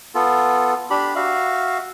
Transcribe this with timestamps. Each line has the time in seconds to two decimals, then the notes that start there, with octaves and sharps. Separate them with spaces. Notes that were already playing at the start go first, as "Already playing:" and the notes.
0.15 B3 F4 A4
0.90 D4 G4 B5
1.15 F#4 E5 F5